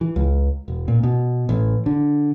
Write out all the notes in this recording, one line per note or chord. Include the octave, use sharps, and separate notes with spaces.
E3
C#2
E1
A#2
B2
A1
D3